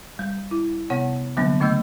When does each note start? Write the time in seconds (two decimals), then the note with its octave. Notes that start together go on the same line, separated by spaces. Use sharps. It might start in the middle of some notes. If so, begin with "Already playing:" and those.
0.19 G3
0.51 E4
0.90 C3 B3 C#5 F#5
1.37 D3 F#3 G3 A#3 B3 D4
1.60 C#3 A3 D4 D#5 E6 G6